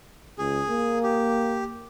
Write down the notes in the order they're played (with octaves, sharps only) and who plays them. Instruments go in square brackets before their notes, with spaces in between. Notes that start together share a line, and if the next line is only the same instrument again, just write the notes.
[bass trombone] C#2 [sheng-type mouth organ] G#4
[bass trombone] A#3
[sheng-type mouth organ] G4